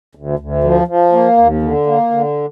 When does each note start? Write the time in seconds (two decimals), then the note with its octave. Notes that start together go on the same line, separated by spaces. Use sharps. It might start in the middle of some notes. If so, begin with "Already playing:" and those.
0.15 D2
0.39 D2
0.64 F3
0.88 F3
1.12 A#3
1.38 D#2
1.62 D3
1.87 A#3
2.11 D3